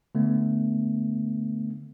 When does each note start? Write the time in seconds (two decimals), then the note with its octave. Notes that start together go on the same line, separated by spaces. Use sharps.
0.15 D3 A3 B3